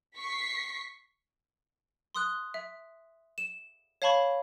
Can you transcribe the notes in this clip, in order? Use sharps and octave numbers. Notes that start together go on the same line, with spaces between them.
C#6 B6 C7
C6 D#6 F#6
E5
E7
C#5 F5 A5 B5 C#6